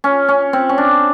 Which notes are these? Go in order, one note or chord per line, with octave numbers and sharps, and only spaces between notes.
C#4
C#4
C4
C#4
D4